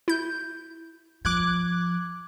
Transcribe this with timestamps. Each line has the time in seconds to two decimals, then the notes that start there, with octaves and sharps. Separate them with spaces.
0.08 E4 G6
1.25 F3 D6 F#6 G#6